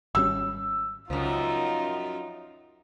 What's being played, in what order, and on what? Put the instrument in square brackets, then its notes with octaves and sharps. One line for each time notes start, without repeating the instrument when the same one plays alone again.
[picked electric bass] G#1 G3 C#4 [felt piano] E6
[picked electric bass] C#2 [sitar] F#2 F3 [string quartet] D#4 F4